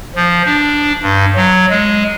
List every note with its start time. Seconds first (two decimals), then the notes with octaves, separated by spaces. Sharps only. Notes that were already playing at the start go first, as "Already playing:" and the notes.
0.16 F3
0.46 D4
1.02 G2
1.36 F#3
1.70 G#3